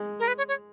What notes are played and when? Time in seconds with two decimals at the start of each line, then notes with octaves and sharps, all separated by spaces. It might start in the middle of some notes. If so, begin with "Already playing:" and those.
Already playing: G#3
0.19 A#4
0.28 B4
0.38 C#5
0.48 C#5